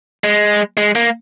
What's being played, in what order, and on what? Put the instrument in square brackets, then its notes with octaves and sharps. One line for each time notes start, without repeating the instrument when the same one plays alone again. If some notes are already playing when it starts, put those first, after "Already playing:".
[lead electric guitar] G#3
G#3
A#3